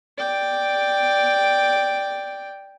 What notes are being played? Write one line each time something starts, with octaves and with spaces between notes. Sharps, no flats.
D5 G5